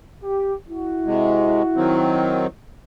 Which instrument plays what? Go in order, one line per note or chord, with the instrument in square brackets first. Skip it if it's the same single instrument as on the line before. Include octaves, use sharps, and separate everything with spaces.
[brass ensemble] G4
E4 F#4
[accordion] C3 G#3
D#3 F#3 C4